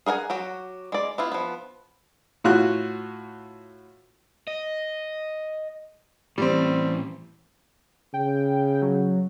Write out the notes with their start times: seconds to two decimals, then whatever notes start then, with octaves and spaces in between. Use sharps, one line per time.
0.06 G#4 A#4 F#5 G#5
0.30 F#3 F#4 G4
0.92 G#3 D5
1.18 B3 E4 F4
1.32 F3 B3
2.44 A2 F4 F#4 F#6
4.47 D#5
6.38 A2 E3 G3 C4
8.14 C#3 G5
8.82 F#3